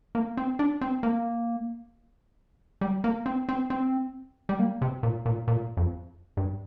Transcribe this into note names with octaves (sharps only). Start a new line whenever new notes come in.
A#3
C4
D4
C4
A#3
G3
A#3
C4
C4
C4
G3
A#3
C3
A#2
A#2
A#2
F2
G2